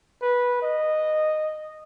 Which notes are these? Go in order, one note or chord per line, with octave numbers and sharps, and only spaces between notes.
B4
D#5